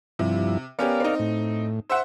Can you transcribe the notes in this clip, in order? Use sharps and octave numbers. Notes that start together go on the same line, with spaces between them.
G2 C3 F3 E4
B3 C#4 G4 A#4 D5 F5
C4 D#4
A2
C5 E5 F#5 E6